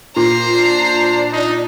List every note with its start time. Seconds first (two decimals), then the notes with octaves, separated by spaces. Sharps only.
0.16 A#2 C5 A#5 C7
0.56 D4
1.33 D#4